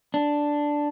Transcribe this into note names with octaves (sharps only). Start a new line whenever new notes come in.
D4